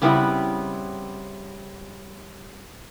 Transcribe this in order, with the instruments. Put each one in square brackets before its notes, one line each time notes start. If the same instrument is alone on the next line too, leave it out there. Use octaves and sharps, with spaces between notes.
[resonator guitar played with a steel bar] C#3 G3 B3 C4 E4